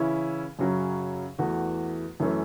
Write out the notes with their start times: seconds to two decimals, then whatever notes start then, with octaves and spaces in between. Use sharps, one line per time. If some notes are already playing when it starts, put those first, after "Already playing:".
Already playing: C#3 E3 C#4 E4
0.59 F#2 C#3 F#3 C#4
1.38 E2 E3 A3 F#4
2.20 F#2 E3 A3 C#4